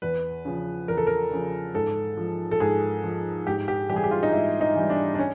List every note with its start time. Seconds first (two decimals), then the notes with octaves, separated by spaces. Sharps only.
0.02 E2 B4
0.45 C#3 F3
0.88 E2 A#4
0.97 A4
1.07 A#4
1.31 C#3 F3
1.74 G#2 A4
2.17 F3
2.51 A4
2.60 G#2 G#4
3.04 F3
3.46 G#2 G4
3.68 G4
3.89 E3 G3 G4
3.96 G#4
4.04 G4
4.11 F4
4.23 D#4
4.33 G#2 E4
4.61 D#4
4.76 E3 G3
4.90 D4
5.14 D4
5.19 C#4